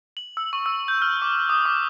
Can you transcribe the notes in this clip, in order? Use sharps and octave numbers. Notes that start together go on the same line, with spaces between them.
F#7
E6
C#6
E6
G6
F6
D6
D#6
D6